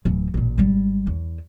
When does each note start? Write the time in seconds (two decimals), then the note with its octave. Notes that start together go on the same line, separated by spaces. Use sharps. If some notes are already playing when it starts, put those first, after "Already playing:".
0.05 D1 E3
0.34 A1 A#2
0.58 G#1 G3
1.07 E2